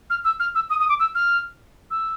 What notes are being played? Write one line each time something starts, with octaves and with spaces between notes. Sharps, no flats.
F6
E6
F6
E6
D#6
D#6
D6
E6
F6
E6